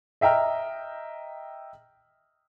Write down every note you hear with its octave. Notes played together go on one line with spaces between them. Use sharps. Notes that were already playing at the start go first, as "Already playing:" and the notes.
D#5 E5 G5 A#5 F6